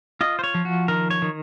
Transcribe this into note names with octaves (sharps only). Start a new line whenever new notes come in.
F4 D#5
C5
C#5
F3
F#4
D#3 A#4
C#5
D#3